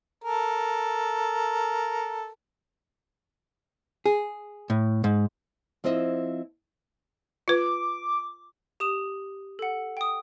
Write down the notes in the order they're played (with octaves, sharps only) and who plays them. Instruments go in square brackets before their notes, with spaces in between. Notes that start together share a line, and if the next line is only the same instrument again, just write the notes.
[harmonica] A4 A#4
[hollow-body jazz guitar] G#4
A2
G#2
[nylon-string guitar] F3 C4 E4 D#5 E5
[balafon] F4 B4 [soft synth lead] D6
[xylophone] G4 D#6 E7
A4 F#5
G5 D#6